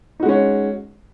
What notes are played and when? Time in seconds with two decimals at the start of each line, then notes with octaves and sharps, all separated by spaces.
0.20 D#4
0.23 F#4
0.26 G#3
0.29 C#4